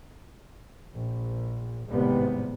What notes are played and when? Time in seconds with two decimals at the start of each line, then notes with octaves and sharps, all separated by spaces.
0.94 A#1
1.89 G#1 A2 C3 G3 B3